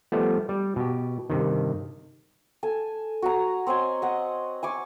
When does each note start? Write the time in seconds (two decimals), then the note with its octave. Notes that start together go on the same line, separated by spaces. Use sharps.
0.12 F3 G3 A3 B3
0.49 G3
0.76 B2 G4
1.30 G2 C3 D#3
2.63 A4 G#5
3.22 F#4 G#5 A#5
3.67 C4 C#5 D#5 G#5
4.02 D#5 F#5
4.63 G#5 C#6 D6